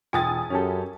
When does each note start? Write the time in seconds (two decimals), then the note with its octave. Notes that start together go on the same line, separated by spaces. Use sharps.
0.13 E1 F4 G5 G#5 D#6 A6
0.50 F#2 C#4 G4 A4